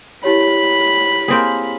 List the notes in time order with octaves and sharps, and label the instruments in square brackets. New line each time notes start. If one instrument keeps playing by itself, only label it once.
[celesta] E4 G4 C#5 [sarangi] B5
[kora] A#3 C4 G#4